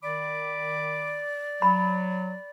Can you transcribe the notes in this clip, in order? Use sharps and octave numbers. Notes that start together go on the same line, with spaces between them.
D#3 D5 B5 D6
F#3 B5